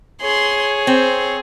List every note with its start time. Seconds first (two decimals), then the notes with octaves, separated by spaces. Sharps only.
0.22 G#4 C#5 C6
0.87 C4 C5